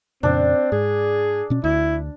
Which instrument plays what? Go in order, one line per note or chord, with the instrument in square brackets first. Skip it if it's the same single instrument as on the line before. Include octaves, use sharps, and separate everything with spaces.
[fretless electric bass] F2 A#2 C#3 [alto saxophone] C4 [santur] D4
[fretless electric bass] G#2 [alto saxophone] G#4
[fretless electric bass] B2 C#4
[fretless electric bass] D2 [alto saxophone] E4